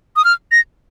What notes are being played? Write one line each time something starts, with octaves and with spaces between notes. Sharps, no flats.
D#6
F6
A#6